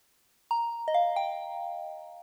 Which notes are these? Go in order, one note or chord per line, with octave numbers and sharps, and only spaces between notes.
A#5
D#5
F5
G5